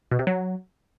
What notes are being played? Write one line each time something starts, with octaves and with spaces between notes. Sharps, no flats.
B2
C3
F#3